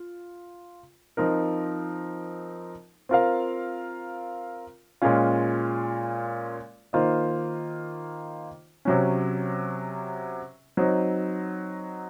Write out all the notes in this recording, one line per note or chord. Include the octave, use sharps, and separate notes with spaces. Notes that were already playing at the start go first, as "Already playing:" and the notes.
Already playing: F4
F3 C4 D#4 A#4
C4 F4 A#4 F5
A#2 G#3 C#4 F4
D#3 A#3 F4 C5 D#5
C3 F#3 C#4
F#3 C4 D#4